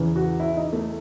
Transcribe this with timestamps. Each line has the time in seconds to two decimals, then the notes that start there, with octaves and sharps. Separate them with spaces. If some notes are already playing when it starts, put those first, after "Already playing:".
Already playing: E2 C#3 E3
0.16 F#4
0.40 E4
0.57 D#4
0.73 A3